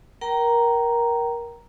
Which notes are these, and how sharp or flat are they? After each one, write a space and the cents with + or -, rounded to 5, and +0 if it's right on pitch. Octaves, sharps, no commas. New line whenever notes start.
A#4 +20 G5 -30 A#5 +0